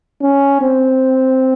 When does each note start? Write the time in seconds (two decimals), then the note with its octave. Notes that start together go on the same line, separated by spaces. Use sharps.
0.22 C#4
0.61 C4